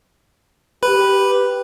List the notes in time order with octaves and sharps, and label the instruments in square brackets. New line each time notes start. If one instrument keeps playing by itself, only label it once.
[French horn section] G4 [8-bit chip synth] B4